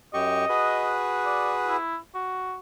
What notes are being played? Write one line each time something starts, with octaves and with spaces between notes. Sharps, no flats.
F#2 G4 D#5 C#6
F#4 G#4 B4
D5
E4
F#4